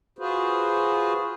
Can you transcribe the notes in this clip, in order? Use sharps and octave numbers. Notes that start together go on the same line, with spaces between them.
F4 F#4 G#4 B4 C5